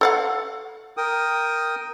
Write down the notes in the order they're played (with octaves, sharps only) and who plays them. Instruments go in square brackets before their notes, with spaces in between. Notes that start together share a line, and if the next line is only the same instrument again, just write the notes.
[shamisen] A4 F5 F#5
[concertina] A#4 G5 D#6